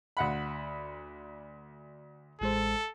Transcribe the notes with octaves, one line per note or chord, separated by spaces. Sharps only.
D2 F#5 B5
A1 G#3 A4 C5